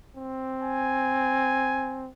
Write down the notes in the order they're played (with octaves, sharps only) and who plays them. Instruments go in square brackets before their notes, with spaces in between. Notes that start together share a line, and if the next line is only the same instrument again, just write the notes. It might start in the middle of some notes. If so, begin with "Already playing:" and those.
[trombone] C4
[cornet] G#5